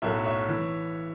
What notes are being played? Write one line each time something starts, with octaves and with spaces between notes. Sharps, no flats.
B1 A2 F#3 A3 C#5 E5
C#5 E5
E3